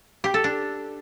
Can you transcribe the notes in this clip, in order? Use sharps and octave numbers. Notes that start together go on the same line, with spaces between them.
G4
A4
D4